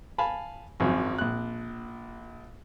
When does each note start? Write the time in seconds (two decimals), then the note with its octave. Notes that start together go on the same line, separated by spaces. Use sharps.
0.18 F5 G#5 A5 B5
0.80 G#1 F#2 F3 F#3
1.18 A#1 F#6